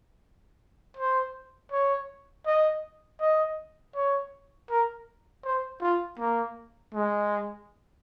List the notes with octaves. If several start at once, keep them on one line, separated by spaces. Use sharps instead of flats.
C5
C#5
D#5
D#5
C#5
A#4
C5
F4
A#3
G#3